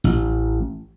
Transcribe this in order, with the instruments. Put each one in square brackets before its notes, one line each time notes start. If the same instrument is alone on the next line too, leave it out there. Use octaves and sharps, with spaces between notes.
[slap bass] A1